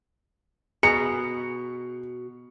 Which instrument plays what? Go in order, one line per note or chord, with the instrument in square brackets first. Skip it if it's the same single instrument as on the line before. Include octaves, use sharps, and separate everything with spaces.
[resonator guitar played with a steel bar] B2 [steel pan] G#4 A#5 [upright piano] C#7